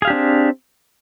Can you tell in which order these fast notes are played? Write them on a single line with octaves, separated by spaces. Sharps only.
G#4 F5 G4 D4 C4